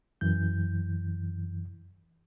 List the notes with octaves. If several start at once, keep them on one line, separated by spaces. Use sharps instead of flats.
F#2 E3 G6